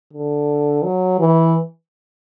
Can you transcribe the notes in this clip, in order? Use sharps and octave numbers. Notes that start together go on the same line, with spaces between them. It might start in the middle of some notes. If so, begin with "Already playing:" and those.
D3
F#3
E3